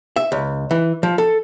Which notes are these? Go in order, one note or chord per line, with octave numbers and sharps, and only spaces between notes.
E5
C#2
E3
F3
A4